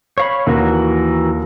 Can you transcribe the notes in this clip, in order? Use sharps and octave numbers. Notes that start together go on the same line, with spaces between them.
C#5 F5 B5
D#2 E3 F#4 A#4